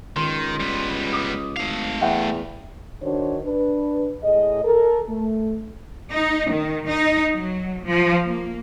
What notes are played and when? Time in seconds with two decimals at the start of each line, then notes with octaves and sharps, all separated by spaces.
0.16 C#2 D#3 C6
0.60 G3 B3
1.12 D6 D#6
1.56 G#1 A3 F5
2.01 E2 E5 F#5 G5
3.03 D#3 D4 F#4 C5 C#5
3.44 D4 B4
4.23 A2 G#4 D#5
4.65 A4 A#4
5.10 A3
6.10 D#4
6.50 D#3
6.87 D#4
7.33 F#3
7.85 F3
8.27 A#3